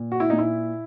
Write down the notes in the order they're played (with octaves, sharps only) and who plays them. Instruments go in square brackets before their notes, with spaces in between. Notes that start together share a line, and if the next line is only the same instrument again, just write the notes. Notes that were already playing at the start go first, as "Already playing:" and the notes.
Already playing: [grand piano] A#2
F#4
E4
A#2 D#4
E4